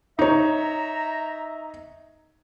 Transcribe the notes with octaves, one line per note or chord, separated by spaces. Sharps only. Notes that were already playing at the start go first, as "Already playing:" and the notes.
D#4 C#5 E5 A#5